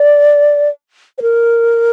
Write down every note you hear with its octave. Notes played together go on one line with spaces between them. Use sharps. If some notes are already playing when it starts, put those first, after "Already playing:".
Already playing: D5
C5
A#4